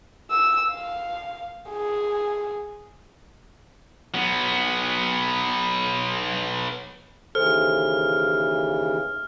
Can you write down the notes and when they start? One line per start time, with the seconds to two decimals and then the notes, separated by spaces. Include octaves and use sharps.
0.31 E6
0.72 F5
1.69 G#4
4.14 F#3 B3
7.35 D#2 C#3 E3 A4 C5 F6